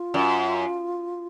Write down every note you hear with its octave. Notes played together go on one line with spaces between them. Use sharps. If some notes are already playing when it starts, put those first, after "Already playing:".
Already playing: F4
F#2